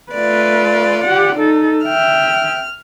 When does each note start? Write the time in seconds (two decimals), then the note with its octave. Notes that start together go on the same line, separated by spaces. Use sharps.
0.13 A3 F4 B4 D5
1.04 G4 F#5
1.36 D#4 A4
1.85 E5 G5 F6